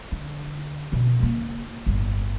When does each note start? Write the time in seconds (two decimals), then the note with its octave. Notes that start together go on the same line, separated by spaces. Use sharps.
0.12 D3
0.92 F#2 B2
1.20 C#3 A#3
1.86 G1 A2